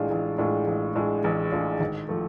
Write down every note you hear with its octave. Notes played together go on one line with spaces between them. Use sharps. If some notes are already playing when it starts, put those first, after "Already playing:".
Already playing: A1 A2 G#3 D4 F4
A1
A2 G#3 D4 F4
A1
A2 G#3 D4 F4
A1
A2 G#3 D4 F4
G#1
F3 A3